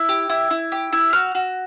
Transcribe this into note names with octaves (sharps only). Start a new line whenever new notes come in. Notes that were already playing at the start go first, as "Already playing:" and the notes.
Already playing: E4
G4
E4
E4
G4
E4
F#4 F6
F#4